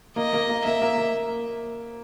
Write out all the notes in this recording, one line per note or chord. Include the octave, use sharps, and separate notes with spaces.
A#3 D#5
A#3
A#3
A#3 E5
A#3
A#3